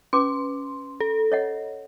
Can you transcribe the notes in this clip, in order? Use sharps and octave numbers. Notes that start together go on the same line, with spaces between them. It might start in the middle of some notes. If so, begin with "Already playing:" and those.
C#4 B4 C6 D6
A4
C#5 D#5 F#5